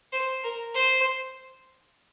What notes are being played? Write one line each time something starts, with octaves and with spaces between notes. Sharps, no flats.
C5
A#4
C5